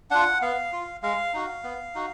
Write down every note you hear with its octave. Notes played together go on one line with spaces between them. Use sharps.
D4 F4 F#5
B3 F5
F4
G#3 F5
D#4 F#4
B3
D#4 F#4